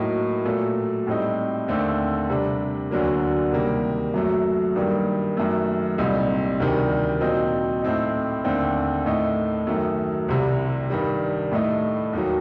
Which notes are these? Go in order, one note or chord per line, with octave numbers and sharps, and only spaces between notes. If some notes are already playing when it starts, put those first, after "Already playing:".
Already playing: A2 F#3 A#3 D#4
A#2 F#3 A3
A2 G3 C4 D#4
D#2 D3 A3 C4
C3 G3 D4
D2 D3 F#3 A#3
C3 D#3 G3 A#3
F#2 F#3 A3
G2 D#3 G3 A#3
F#2 D#3 A3
C2 A#2 G3 C4 D#4
D2 C3 D#3 G3
A#2 F#3 C4 D#4
A2 A3 C4 D#4
D#2 D3 A3 C4
A2 A3 D#4
F#2 D#3 F#3 A3
C2 C3 G3
G2 D#3 G3
A2 A3 D#4
D#2 D#3 F#3